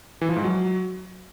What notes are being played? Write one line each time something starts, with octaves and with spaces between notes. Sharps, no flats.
E3
F3
G#2
F#3